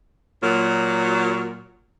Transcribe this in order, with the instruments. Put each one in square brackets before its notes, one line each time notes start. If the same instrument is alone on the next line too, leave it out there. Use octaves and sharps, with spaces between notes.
[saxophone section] A#2 F#3